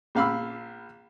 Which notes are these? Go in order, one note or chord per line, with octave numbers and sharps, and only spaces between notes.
A#1 F5 B5 E6